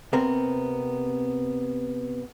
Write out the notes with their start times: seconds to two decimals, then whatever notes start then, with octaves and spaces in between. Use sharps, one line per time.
0.13 C3 B3 C4 A#4